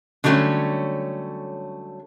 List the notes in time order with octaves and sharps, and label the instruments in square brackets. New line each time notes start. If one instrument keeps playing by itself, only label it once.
[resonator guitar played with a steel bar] D3 F#3 G3 A3 C#4